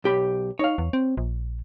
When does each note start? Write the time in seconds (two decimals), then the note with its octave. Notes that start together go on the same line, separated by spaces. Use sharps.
0.04 B1 G4 B5
0.59 D#4 C#5 F5
0.78 E2
0.93 C4
1.17 A#1